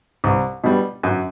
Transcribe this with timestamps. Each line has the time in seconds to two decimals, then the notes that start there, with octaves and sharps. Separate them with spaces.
0.24 C2
0.64 B2 G3
1.03 F#2